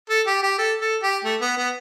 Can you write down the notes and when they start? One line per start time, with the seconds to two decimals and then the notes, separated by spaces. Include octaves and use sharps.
0.10 A4
0.27 G4
0.43 G4
0.59 A4
0.81 A4
1.03 G4
1.24 A3
1.41 B3
1.57 B3